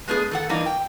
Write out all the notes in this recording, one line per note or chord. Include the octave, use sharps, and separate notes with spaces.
G#3 A3 B3 D4 G#4
D#3 A4 F#5
E3 G3 A#3 D4 D#4
G5